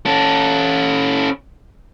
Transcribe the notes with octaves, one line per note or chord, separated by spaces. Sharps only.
C#4 A4